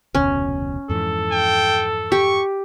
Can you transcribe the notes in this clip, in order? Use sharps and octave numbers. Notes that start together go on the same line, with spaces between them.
F1 D2 B2 C#4
F2 G#2 E3 A4
G5
G4 C#6